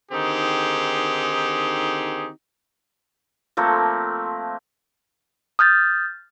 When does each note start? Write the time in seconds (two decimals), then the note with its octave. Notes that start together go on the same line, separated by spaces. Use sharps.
0.12 D3 D#3 C4 D#4 G4 G#4
3.57 F3 A3 A#3 C4
5.59 D#6 F6 G6 A6